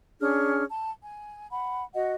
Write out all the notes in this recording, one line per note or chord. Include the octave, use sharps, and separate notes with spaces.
C#4 D4 G#4 F6
A5
G#5
F#5 B5
F#4 D#5 F#5